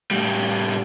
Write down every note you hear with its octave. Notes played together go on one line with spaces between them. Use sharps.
A2 G3